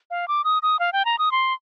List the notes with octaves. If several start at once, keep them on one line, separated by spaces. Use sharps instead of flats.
F5
D6
D#6
D#6
F5
G5
A#5
D#6
C6